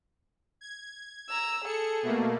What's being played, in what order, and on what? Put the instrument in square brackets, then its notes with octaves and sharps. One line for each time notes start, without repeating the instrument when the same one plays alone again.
[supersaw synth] G#6
[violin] A#5 E6
[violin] G#4 A4 [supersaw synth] C#7
[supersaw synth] B2 A3 A#3